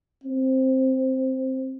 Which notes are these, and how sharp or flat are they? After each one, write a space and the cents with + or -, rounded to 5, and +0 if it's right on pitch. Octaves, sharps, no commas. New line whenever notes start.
C4 +5